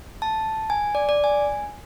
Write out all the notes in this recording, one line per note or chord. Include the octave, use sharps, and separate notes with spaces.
A5
G#5
D5
D5
G#5